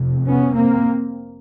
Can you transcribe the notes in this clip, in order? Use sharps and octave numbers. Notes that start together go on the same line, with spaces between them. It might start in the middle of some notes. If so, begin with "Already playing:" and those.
Already playing: F1 F2 C3
B3 C#4
A#3 C4